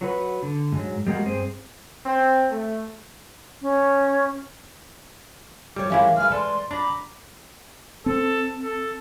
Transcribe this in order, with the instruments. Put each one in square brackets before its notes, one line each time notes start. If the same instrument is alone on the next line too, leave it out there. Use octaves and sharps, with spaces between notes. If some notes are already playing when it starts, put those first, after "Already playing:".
[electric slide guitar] F#3 F#4 B4
D3
G#2 F#3
G3 G#3 A#3 F#4
G2 C4 G#4 C5
[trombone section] C4
A3
[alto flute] C#4
[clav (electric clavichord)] G3 [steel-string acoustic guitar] A4 C#5 [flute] D6
[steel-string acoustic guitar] E3 G#3 A#4 [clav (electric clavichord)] G3 C#4 E4 [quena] F5
[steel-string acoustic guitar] G#3 B4 [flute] F6
[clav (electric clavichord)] A4 [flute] D5 [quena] C6
[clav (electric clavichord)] D4 [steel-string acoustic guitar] A#5 [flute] B5 [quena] D6
[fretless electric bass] C4 [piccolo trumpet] A4
[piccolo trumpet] A4